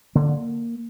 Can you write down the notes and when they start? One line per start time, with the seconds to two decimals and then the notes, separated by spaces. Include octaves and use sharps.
0.15 D3 A#3